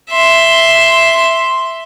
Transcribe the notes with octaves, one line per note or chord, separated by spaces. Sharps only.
E5 C6